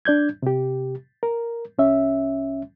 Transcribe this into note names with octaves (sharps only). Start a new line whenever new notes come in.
D4 D5 G6 G#6
C3 G4
A#4
C2 C#4 E5